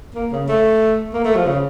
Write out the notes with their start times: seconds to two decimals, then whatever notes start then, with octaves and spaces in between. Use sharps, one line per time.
0.15 A#3
0.32 C#3
0.48 A3
1.13 A#3
1.24 A3
1.35 F3
1.46 C#3